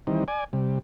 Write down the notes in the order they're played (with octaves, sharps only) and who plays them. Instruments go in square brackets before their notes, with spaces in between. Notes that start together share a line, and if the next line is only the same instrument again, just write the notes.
[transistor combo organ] D#3 E3 G3 C4 D#4
D5 G#5
C3 G3